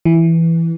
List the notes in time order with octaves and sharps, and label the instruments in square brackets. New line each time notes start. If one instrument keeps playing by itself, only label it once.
[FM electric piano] E3